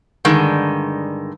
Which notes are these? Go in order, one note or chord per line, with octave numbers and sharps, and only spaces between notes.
G2 D3 D#3 G#3